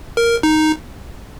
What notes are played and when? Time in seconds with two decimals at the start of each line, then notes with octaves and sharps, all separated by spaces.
0.17 A#4
0.43 D#4